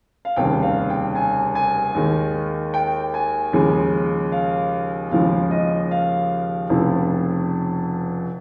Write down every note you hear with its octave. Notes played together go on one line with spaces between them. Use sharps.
F5
F1 D#2 C#3 G3 G5
F5
G5
G#5
G#5
D#2 D#3 G#3
G5
G#5
D#2 C#3 F3 G#3
F5
D#2 C#3 F3 G#3 F5
D#5
F5
F1 F2 C#3 F3